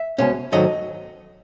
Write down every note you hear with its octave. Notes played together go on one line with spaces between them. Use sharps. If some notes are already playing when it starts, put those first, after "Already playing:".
Already playing: E5
C2 B2 G#3 C#4
G#2 D#3 F#3 A3 D#5